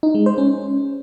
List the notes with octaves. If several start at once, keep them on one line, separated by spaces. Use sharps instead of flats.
D#4
G#3
C5
C#4